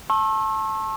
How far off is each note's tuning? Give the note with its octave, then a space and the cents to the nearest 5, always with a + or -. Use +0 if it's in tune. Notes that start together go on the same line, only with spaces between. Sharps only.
A5 +0 C#6 -45 E6 +0